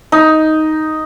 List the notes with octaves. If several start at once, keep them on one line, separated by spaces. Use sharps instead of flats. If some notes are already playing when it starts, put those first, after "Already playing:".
D#4